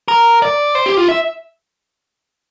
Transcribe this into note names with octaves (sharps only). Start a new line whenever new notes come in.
A#4
D5
C5
G4
F4
E5